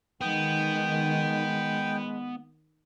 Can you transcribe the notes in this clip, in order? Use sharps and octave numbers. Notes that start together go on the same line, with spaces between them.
D#3 G#3 B3 G5